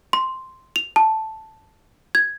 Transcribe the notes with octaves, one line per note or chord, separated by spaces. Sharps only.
C6
F7
A5
G#6